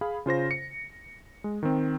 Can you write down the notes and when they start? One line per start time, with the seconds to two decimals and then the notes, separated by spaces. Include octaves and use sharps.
0.01 G#4 F5 B5
0.26 C#3 F4 C5 A#6
0.51 C#7
1.44 G#3
1.63 D#3 C4